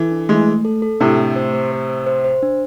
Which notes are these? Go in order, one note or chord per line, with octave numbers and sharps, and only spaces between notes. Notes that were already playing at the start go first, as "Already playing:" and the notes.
Already playing: E3 A4
D4
E3 G#3 A3
A3
A4
A4
A2 C3 D4
A3
C5
C5
C5
C5
C5
C5
D4